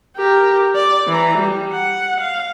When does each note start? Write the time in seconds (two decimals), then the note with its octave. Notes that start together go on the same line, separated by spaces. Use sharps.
0.17 G4 A#4
0.76 D5
1.07 E3 A#5
1.37 G3
1.72 F#5
2.20 F5